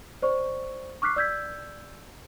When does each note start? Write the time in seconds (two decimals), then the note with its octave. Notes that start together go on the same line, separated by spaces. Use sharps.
0.22 C5 D5 C#6
1.02 C#6 D6 F6 F#6 B6 C7
1.16 D5 E6 G6 G#6 B6